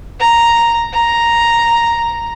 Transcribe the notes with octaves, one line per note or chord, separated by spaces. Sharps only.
A#5
A#5